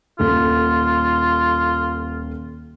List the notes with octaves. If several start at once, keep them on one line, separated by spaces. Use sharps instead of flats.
D#1 F4 A4